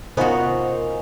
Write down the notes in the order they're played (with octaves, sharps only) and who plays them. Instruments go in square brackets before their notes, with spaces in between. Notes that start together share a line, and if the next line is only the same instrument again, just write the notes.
[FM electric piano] C3 A#4 C5 [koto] B3 F#4 [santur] C#4 D#4 F4